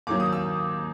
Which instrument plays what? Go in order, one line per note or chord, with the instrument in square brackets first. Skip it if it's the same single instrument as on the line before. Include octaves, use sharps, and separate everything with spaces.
[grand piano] D#2 D#3 F#3 A#3 D6
D#6
E6